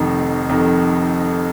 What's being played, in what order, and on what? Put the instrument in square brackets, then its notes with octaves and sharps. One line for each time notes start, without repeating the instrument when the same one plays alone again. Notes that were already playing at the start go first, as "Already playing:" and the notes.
Already playing: [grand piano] F1 F2 D#3
F1 F2 D#3